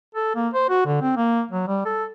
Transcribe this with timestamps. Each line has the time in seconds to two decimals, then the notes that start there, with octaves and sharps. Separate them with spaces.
0.15 A4
0.35 A#3
0.54 C5
0.69 F#4
0.86 D3
1.02 C4
1.17 A#3
1.51 F#3
1.68 G3
1.86 A4